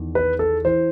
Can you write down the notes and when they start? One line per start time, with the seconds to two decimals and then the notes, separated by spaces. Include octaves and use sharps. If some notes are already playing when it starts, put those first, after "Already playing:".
Already playing: E2 D#3
0.15 B4
0.39 A4
0.65 E3 C5